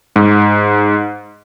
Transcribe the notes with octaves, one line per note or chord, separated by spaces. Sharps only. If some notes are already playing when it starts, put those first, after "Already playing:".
G#2